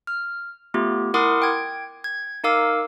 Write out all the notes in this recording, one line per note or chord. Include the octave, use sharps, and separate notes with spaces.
F6
A3 B3 F4 G4
E4 A#4 F#5 C6 D6 D#6
G5 G#6
G#6
D#4 A#4 F5 D6 E6